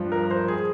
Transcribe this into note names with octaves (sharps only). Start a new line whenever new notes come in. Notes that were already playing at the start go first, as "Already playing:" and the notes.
Already playing: G2 F3
A#4
C5
G#4